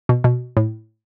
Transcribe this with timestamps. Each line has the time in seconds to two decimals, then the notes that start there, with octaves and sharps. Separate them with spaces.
0.09 B2
0.24 B2
0.57 A2